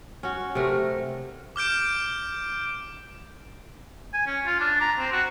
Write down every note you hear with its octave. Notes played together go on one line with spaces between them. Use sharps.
C#4 F#4
C3 A3 A#4
D6 F6 G6 D7
G#5
C#4
F4
D4
A#5
C4
F#4